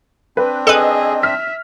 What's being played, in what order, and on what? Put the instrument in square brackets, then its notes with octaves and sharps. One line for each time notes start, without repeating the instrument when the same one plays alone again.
[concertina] C4 D4 [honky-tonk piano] B4
[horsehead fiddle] G#4 [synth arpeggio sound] A4 B4 [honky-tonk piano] D#5 E6
[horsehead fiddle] E5 [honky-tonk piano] F6 B6